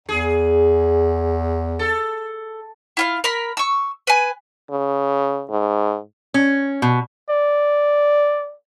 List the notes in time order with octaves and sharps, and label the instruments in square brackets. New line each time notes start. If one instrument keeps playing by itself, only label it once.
[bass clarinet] E2 [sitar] G#4
[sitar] A4
[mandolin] E4 F4 F5
A#4 B5
C#6 E6
B4 G#5
[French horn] C#3
G#2
[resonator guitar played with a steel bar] C#4
B2
[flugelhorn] D5